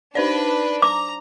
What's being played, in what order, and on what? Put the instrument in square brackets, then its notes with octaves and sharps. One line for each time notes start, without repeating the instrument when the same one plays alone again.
[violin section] D4 B4 [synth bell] D#4 C5 D5
[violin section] A#5 [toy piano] D6